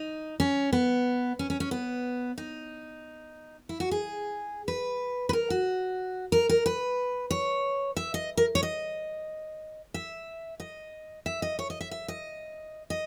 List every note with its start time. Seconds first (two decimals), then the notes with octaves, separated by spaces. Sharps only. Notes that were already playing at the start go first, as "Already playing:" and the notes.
Already playing: D#4
0.40 C#4
0.73 B3
1.39 C#4
1.50 C#4
1.60 C#4
1.71 B3
2.38 D#4
3.69 E4
3.80 F#4
3.91 G#4
4.68 B4
5.29 B4
5.33 A#4
5.50 F#4
6.32 A#4
6.49 A#4
6.66 B4
7.31 C#5
7.97 E5
8.14 D#5
8.37 A#4
8.55 C#5
8.63 D#5
9.94 E5
10.60 D#5
11.26 E5
11.42 D#5
11.59 C#5
11.70 D#5
11.81 E5
11.91 E5
12.08 D#5
12.90 D#5